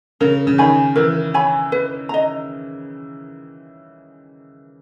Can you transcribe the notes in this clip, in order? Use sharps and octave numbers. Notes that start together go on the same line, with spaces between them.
C#3 A#4
C#3
D#3 C#5 G#5 B5
E3 A#4
C#5 G#5 B5
B4
D#5 A#5